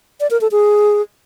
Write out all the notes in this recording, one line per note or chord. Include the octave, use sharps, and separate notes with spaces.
D5
A#4
A4
G#4